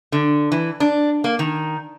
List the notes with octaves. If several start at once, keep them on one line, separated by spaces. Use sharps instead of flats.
D3
E3
D4
A#3
D#3